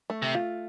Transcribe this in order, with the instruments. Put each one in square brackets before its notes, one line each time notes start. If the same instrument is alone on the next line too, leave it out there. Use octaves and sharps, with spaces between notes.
[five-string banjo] A3
[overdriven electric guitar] C3
[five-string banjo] F4